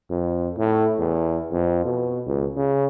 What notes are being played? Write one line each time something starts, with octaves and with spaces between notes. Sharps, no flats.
F2
A2
E2
F2
B2
C#2
C#3